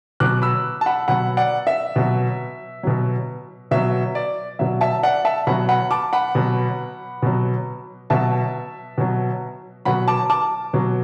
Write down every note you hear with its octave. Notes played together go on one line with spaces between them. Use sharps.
B2 F#3 D6 F#6
B5 E6
A5
F#5 B5
B2 F#3 F#5 B5
D5 F#5
E5
B2 F#3
B2 F#3
B2 F#3 E5
D5
B2 F#3 E5
E5 A5
D5 F#5
E5 A5
B2 F#3 F#5 B5
F#5 B5
A5 D6
F#5 B5
B2 F#3
B2 F#3
B2 F#3 E5 A5
B2 F#3
B2 F#3 F#5 B5
A5 D6
A5 D6
B2 F#3